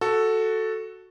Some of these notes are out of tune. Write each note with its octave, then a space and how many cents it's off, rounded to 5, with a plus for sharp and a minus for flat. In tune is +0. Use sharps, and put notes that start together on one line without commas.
F#4 +0 A4 +0